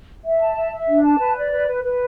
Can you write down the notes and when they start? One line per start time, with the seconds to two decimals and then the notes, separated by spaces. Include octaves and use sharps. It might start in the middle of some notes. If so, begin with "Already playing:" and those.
0.23 E5
0.39 A5
0.55 E5
0.71 E5
0.87 D4
1.03 A5
1.19 B4
1.35 D5
1.51 B4
1.67 B4
1.84 B4